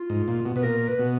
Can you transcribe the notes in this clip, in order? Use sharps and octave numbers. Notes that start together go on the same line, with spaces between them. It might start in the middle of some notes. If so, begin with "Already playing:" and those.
Already playing: F4
G#2
A#2
B2
B2 B4
A#2 A#4
B4
B2